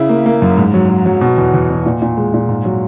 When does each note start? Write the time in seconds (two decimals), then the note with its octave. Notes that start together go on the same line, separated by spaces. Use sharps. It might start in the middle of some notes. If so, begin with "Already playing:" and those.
Already playing: C#3 E4
0.09 A#3
0.26 A#3
0.42 F#2
0.57 G#2
0.74 F#3
0.89 F#3
1.06 F#3
1.21 B2
1.37 E2
1.54 E2
1.70 B2
1.86 A#2
2.02 A#2
2.17 G#3
2.34 A#2
2.49 G#2
2.65 F#3